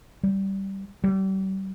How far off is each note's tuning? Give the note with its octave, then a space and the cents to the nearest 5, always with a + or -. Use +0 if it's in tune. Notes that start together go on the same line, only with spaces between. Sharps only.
G3 -10
G3 -35